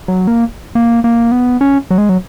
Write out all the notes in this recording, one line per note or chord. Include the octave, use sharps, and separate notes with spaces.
F#3
A#3
A#3
A#3
B3
C#4
F#3
G#3
F#3